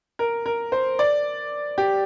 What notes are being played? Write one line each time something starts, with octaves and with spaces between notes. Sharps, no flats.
A#4
A#4
C5
D5
G4